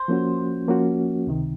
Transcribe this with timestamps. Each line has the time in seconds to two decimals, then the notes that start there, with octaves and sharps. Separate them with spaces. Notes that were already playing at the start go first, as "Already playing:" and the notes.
Already playing: C5
0.08 F3 A#3 C#4 F#4
0.68 F3 A#3 C#4 F#4
1.27 C#2 C3 D#3